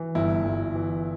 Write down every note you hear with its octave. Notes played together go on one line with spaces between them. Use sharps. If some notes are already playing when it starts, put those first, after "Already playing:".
Already playing: E3
G1 E4
G1
E3